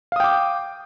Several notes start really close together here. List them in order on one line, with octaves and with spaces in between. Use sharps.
F5 D#6 G5 D6